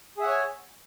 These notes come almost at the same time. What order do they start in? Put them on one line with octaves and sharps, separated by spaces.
G#4 E5 F#5 C#5 G#5